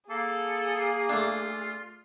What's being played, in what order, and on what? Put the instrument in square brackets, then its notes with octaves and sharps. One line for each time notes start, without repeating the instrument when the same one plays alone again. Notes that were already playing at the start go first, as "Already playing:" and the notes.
[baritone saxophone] A#3 [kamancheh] G#4 [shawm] A4
[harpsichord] A3 D4 [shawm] F4